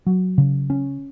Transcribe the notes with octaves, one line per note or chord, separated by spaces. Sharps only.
F#3
C#3
C#4